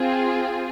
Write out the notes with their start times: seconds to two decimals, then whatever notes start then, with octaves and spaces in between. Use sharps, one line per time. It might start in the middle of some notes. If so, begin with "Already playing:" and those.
Already playing: C4 F4 G#4